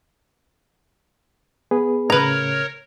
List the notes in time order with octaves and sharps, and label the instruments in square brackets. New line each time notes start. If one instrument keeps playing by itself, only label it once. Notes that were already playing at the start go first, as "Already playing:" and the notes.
[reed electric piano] B3 G#4 B4
[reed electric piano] A2 C#3 [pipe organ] A#4 C#5 [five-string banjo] B4 A#5